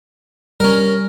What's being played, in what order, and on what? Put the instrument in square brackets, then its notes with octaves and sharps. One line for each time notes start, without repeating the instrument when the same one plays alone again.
[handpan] G3 [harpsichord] C#4 A#4